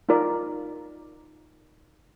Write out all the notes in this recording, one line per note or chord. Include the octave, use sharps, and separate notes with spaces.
D#4 F4 A#4 D5